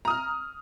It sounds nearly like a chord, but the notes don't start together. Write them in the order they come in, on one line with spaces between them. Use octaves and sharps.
A#5 D#6 F6